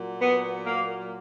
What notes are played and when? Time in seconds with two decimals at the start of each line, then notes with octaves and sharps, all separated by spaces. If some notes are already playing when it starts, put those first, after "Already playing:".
Already playing: A#2 F#3
0.21 B3
0.66 A#3